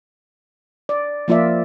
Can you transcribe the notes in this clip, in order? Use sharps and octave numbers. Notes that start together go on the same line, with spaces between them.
D5
F3 A#3 F4 D5 E5